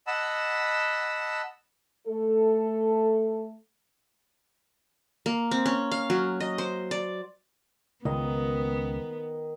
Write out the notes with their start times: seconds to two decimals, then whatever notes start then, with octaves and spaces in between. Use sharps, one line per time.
0.07 D#5 F#5 A5 B5 E6
2.07 A3 A4
5.26 A#3
5.51 C4
5.66 C#4
5.92 F5
6.10 F#3
6.40 D#5
6.58 C5
6.91 D5
8.05 C#2 D#3 B3 D#5